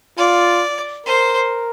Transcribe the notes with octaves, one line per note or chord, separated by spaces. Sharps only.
F4 D5
A#4 C5